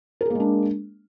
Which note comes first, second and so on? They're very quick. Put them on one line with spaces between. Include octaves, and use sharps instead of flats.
A#4 G#4 A#3 G#3 D4